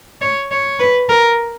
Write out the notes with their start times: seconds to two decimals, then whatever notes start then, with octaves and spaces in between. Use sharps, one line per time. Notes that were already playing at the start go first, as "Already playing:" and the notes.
0.21 C#5
0.51 C#5
0.79 B4
1.09 A#4